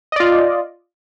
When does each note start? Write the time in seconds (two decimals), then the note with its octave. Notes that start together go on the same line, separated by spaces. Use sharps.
0.12 D#5
0.16 D5
0.20 F4